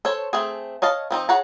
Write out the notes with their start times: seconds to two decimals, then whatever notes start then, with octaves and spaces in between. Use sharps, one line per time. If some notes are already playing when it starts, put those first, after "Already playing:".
0.05 A4 C5 C#5
0.33 A3 C4 G#4
0.82 C#5 D#5 F5 A5
1.11 F3 C4 D#4
1.29 G#4 C#5 F#5 A5 A#5